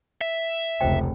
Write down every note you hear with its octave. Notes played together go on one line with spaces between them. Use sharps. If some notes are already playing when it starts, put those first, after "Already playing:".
E5
F1 C#2 C5 D#5 G5